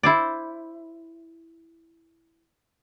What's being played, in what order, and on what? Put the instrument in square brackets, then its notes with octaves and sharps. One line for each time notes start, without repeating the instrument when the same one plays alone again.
[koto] E4 C5 D5